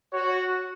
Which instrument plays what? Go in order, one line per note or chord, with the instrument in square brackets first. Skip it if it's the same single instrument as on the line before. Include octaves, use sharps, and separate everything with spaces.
[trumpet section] F#4 [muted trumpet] C#5